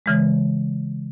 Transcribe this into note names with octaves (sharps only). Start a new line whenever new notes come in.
C#3 E3 G#3